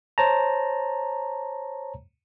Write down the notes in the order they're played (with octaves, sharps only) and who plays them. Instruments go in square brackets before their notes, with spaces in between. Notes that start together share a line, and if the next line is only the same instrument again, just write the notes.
[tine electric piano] C5 C#5 A5 A#5